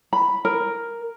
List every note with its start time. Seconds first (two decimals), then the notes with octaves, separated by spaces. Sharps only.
0.13 B5
0.45 A#4